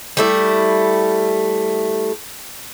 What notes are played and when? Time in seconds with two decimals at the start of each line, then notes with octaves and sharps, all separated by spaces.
0.17 G3 A3 E4